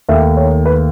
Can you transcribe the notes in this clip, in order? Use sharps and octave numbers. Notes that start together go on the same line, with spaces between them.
D#2 D#3 A3 E5
C#5
B4